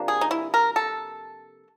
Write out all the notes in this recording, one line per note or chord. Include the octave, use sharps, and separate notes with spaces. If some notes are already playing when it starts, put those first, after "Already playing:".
Already playing: C3 F3 A#3 D4
G#4
D#4
E4
A#4
A4